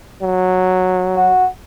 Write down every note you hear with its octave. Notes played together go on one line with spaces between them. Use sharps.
F#3
F#4